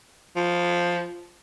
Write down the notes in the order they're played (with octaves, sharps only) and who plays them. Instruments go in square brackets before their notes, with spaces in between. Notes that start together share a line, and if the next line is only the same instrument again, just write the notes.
[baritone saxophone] F3